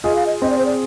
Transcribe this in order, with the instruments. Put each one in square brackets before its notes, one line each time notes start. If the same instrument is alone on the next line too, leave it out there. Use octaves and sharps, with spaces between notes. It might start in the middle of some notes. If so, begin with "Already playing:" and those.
[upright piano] F4 G#4 [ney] D#5
[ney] F5
D#5
[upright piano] C4 [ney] D#5
[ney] D5
C5
D5